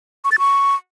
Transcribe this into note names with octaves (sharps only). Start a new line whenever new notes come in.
C#6
A6
C#6